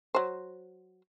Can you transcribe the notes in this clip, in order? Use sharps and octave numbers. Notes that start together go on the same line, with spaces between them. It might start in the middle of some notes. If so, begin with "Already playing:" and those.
F#3 C5